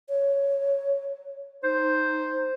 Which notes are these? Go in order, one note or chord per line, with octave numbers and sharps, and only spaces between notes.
C#5
D#4 C5